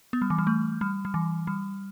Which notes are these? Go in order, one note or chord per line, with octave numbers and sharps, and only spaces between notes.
B3
G3
E3
G3
A3
G3
G3
E3
G3